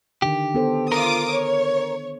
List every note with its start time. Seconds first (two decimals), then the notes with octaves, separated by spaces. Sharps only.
0.22 D3 D#3 G4
0.54 B3 A4 C5
0.92 F4 A#4 D6 D#6
1.31 C#5